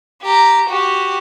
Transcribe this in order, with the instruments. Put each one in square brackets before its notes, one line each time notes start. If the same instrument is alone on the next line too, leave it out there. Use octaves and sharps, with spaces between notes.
[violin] G4 A#5
F#4 G4